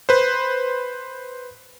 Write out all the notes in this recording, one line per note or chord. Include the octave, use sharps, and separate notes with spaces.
B4 C5